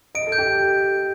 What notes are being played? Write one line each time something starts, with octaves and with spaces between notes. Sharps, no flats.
D#5 D7
A4
G6
G4